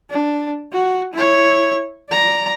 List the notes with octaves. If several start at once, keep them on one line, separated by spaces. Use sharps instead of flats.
D4
F#4
E4 C#5
D5 A#5